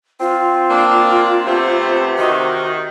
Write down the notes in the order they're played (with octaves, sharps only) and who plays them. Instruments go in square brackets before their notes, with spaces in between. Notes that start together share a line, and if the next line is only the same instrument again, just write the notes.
[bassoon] C4 [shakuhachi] F4
[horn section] A#3 D4
[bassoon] C3 [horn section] A3 B3 C4
[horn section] D#3 [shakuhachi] F#4